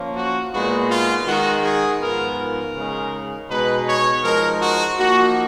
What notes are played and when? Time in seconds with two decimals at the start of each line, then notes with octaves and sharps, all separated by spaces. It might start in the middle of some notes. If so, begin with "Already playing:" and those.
Already playing: F3 A#3 C#4
0.15 F#4
0.52 A#2 G#3 B3 D#4 F#4
0.90 F4
1.26 D#3 G#3 D#4 F#4
1.63 G#4
2.01 G#2 F3 B3 F4 A#4
2.38 A#4
2.75 C#3 G#3 D#4
3.49 B2 G#3 D#4 B4
3.87 C#5
4.24 F3 G#3 D#4 A#4
4.62 F#4
4.98 F3 A#3 D#4 F#4